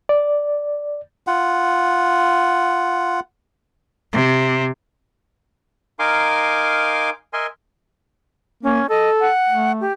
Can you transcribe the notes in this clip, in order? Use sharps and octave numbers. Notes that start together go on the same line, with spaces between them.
D5
F4 F#5
C3
D#4 A#4 F5 G#5 C6 D6
A#4 D#5 E5 G#5 C6
A#3 C#4
A4 D#5
F#5
A3
G4